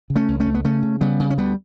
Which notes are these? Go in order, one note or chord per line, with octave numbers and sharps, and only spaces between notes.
C#3
A3 C#4
C#2
A3 C#4
C#2
B3
C#3 A3 C#4
C#3
C#3 G3 B3
C#3
C#4
D2 G3 B3